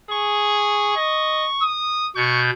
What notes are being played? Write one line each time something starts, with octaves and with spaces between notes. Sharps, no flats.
G#4 C#6
D#5
D#6
B2 C#6 G6